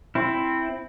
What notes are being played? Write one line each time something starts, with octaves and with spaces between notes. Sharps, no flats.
C4 E4